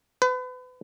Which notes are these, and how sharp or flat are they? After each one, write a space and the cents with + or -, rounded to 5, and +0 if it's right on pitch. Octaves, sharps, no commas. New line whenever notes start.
B4 +35